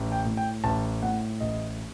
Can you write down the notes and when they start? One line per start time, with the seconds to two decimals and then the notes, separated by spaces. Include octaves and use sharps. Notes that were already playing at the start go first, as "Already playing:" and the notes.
Already playing: A1
0.12 G5
0.25 A2
0.37 G5
0.64 A1 A5
1.02 A2 F#5
1.41 A1 D#5